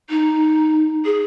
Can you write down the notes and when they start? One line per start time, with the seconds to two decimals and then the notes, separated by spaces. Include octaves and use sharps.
0.10 D#4
1.05 G#4